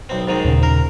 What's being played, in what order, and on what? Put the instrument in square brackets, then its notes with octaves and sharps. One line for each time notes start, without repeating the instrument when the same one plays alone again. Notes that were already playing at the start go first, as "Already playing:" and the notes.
[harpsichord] B1 C4
G#2 D#3 C4
[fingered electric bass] D#2 A#2 C#3
[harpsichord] A#4